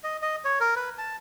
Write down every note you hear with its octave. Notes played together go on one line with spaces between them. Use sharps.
D#5
D#5
C#5
A#4
B4
A5